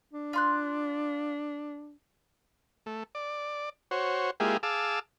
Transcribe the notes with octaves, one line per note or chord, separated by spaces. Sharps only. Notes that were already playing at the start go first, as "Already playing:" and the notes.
D4
F4 C6 F#6
A3
D5
F#4 C5 C#5
G#3 A#3 E4 F4 G4 G#4
G#4 F5 A5 D6 E6